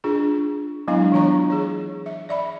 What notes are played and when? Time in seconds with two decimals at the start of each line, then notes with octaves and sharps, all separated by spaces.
0.04 D4 F4 G#4
0.88 F#3 G#3 B3 D4 E4 F5
1.12 E3 D4 F4 C#5 A#5 C#6
1.50 G#4 C#5
2.06 E5
2.29 D5 E5 B5